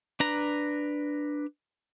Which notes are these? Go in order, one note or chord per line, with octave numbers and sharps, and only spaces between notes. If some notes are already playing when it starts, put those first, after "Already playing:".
D4 B4 A#5